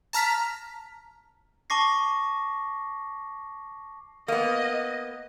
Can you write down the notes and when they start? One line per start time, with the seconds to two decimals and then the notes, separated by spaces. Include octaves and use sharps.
0.13 A5 A#5 F6 B6
1.70 A5 C#6 D6 A#6 C7
4.28 A#3 B3 D#5